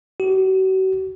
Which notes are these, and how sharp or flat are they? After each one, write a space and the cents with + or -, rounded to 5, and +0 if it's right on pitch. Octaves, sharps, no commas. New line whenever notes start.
F#4 +40